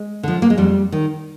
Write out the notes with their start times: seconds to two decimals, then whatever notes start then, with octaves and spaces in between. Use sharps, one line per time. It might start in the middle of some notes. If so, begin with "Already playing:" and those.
Already playing: G#3
0.23 D3 F3
0.42 A#3
0.50 G#3
0.58 F2 G3
0.92 D#3